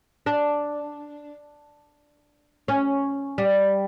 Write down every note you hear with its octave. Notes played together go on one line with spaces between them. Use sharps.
D4
C#4
G3